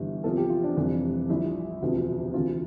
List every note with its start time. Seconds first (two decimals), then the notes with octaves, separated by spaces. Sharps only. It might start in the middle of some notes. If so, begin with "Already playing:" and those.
Already playing: G1 G2 E3
0.24 E2 C3 F3 A4
0.37 G4
0.50 F4
0.64 D4
0.77 F1 F2 E3 G3
1.29 A#1 A#2 G3 E4
1.82 E1 D2 C3 F3
2.34 D2 C3 E3 F4